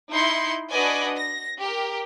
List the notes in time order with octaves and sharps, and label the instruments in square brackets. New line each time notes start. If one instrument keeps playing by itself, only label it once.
[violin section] D#4 E4 C6 G6 C#7
D4 F#4 B4 D5 D#5 G#5
A#6
G4 A#4